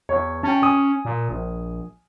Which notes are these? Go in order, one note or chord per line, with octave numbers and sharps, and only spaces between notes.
E2 C#5
C#4 G5 A5
G#5 D#6
A#2
A#1